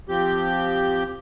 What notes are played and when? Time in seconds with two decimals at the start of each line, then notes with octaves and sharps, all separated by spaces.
0.09 F3 C4 G4 G6